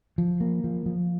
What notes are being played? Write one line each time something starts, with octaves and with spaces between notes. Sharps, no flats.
F3
A#3
F3
F3